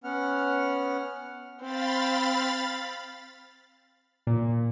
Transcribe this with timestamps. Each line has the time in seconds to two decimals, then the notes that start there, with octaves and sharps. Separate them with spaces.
0.04 B3 C#4 F#5 F6
1.61 C4 F5 B5 A6
4.27 A#2